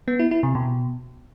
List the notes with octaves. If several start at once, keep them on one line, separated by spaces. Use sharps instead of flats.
B3
E4
E4
C3
B2